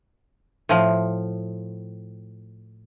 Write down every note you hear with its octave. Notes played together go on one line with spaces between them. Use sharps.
A2 F3